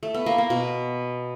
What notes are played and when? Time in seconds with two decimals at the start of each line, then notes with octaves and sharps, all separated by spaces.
0.03 A3
0.14 B3
0.26 A#3
0.38 A#3
0.50 B2